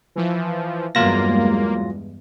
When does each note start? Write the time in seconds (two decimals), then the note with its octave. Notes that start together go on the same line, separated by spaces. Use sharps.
0.16 E3 F3
0.95 E2 G2 F#3 G#3 A#3 F4 A#6